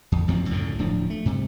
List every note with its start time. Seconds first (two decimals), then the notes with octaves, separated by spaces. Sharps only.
0.12 E2
0.28 A1 F2 F3 C4
0.49 C#2 F#2 A2 D3
0.79 D1 A2 F3 D4
1.10 A3
1.25 G2 C3